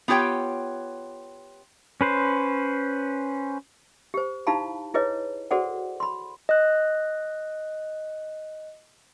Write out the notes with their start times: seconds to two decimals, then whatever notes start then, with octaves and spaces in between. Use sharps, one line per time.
0.08 B3 F4 G4 C#5 G5
2.01 C#4 B4 C5
4.14 G4 C5
4.47 D#4 E4 G4 F5 A5 B5
4.94 E4 G#4 B4 C#5 D#5
5.51 F#4 G#4 A4 C5 D5 F#5
6.00 B5 C6
6.49 D#5 F#6